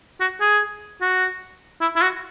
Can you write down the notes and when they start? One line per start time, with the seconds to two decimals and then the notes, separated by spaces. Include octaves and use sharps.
0.20 F#4
0.41 G#4
1.01 F#4
1.81 E4
1.96 E4
2.02 F#4